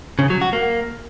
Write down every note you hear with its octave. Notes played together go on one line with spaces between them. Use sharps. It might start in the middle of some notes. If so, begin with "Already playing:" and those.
C#3
F#3
F#4
A#3